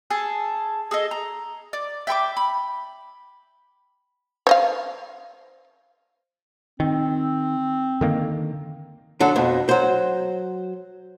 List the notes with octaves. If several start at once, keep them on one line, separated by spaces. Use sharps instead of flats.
G#4 A4 A5
G#4 A4 D#5
A#5
D5
E5 G5 B5 D6
B5
C5 D#5 F5
D#3 C4
D3 D#3 A#3
D3 F#3 A4
F2 B2
F#3 C5